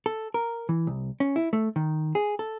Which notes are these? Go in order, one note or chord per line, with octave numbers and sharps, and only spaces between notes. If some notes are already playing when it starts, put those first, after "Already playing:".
A4
A#4
E3
C2
C#4
E4
A3
D#3
G#4
A4